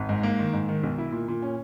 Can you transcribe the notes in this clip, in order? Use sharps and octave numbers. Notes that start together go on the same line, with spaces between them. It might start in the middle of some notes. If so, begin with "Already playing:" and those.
Already playing: G#1
G#2
A#3
D#3
G#2
D#3
B1
E4
A#2
A#2
C#4